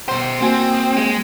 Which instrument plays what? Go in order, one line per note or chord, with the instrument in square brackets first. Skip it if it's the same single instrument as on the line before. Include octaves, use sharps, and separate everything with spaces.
[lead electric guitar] B2 C5
[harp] A#3 F#4 G#5 [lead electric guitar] C4
[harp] D#6 G6
[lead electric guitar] G#3